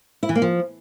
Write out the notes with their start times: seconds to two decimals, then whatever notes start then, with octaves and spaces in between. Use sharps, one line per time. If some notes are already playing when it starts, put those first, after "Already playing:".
0.23 E4
0.29 E3
0.35 A#3
0.42 F3